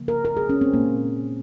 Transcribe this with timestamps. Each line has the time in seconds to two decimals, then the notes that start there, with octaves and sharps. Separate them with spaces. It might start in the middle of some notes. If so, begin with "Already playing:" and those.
Already playing: C#3 F3 A#3
0.08 A#4
0.25 A#4
0.37 G#4
0.49 C#4
0.61 C4
0.73 A#2 G#3 A#3